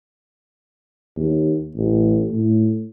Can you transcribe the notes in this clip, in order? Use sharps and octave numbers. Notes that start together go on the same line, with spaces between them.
D#2
A1
A2